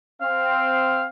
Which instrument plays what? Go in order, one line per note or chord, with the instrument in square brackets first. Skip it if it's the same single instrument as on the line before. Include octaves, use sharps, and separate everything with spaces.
[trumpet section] C4 [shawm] F5